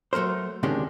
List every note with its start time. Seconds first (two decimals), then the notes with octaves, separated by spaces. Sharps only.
0.13 F#3 A3 A#3 A#4 C5
0.63 D2 C3 D#3 G#3 C#4 D4